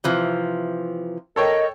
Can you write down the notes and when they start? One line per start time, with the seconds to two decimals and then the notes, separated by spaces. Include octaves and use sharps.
0.04 C3 E3 F3
1.36 A4 A#4 C#5 D#5 G5